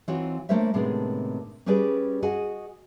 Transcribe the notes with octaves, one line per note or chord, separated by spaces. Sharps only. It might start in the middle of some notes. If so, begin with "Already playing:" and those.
E3 C4 D#4 F4 F#4 C#5
A3 A#3 D4 C5 C#5 E5
A2 C3 D#3 G#3 B3 D4
G3 C#4 G4 G#4 B4 D5
F#4 G#4 D#5 F#5 G#5